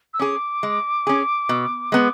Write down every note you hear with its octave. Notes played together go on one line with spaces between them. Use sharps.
E6
C#4 G#4 D6
G#3
C#4 G#4
B2
G#3 B3